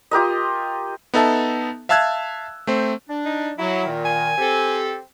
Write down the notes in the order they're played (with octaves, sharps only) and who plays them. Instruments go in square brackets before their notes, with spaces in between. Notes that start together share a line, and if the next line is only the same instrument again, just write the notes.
[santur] F4 G4 A#4 D#5
[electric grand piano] B3 D#4 A4 E5 A5
E5 F5 A5 E6 F#6 G#6
A3 C4 C5
[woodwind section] D4
[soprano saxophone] D#4
[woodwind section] F#3 [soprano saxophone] E4
[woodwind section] A#2 D#3
[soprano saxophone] G#5
[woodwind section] C4 G4 A4